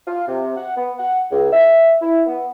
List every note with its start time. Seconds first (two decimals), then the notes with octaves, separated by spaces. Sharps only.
0.07 F4
0.28 C3
0.56 F#5
0.76 B3
0.99 F#5
1.31 C#2
1.52 E5
2.00 E4
2.26 B3